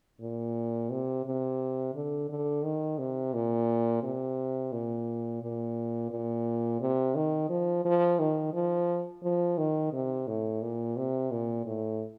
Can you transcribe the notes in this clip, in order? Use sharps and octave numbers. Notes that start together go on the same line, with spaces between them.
A#2
C3
C3
D3
D3
D#3
C3
A#2
C3
A#2
A#2
A#2
C3
D#3
F3
F3
D#3
F3
F3
D#3
C3
A2
A#2
C3
A#2
A2